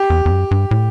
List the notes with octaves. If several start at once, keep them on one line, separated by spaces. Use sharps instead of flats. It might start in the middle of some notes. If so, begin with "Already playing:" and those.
Already playing: G4
E2
E2
F#2
G2
A2